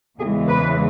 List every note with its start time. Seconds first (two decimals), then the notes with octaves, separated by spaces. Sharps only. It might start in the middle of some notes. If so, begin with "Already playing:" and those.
0.19 E2 C#3 E3 G#3 G#4
0.47 B4